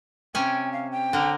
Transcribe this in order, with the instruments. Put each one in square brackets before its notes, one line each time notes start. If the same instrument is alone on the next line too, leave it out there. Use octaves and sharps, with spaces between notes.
[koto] C3 C#4 G#5 [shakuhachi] G5
[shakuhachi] F5
G5
[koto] D3 A#4